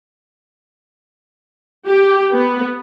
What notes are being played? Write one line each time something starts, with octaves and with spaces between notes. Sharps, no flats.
G4
B3